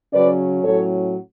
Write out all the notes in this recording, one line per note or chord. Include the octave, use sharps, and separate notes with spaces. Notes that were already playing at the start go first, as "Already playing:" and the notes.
C#3 F#3 C#4 B4 D5
A2 F#3 C#4 A4 C#5